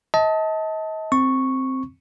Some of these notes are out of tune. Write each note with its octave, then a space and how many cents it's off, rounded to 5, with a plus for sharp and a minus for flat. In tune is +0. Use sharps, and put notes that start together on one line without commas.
D#5 +35 A5 +0
C4 +0 C#6 -5